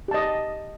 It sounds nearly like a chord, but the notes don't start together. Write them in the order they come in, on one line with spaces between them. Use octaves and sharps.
G4 A5 D#5